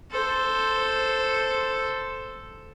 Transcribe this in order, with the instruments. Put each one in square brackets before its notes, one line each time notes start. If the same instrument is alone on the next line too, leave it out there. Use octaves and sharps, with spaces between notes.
[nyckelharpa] A4 C5